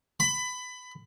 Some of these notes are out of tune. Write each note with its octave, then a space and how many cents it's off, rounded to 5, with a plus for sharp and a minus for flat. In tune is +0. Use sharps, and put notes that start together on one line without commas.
B5 +20